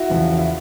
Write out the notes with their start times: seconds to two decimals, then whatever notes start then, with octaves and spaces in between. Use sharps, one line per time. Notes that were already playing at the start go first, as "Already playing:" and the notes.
Already playing: E4 F#4
0.10 E2 C#3 F3
0.38 E4